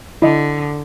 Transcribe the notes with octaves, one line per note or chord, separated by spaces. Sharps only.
D3 E4 D#5